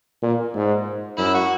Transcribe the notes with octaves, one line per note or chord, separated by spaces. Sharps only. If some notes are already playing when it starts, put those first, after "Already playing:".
A#2
G#2
F#2 E4
F#4